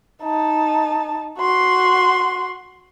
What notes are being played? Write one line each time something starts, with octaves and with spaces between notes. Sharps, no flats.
D#4 A5
F#4 C6